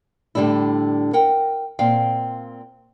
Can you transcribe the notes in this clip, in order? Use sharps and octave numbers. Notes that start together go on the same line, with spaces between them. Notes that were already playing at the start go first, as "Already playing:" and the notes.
A2 D3 G3 D4 E4
A#4 F#5 G5
A#2 C4 F5 G5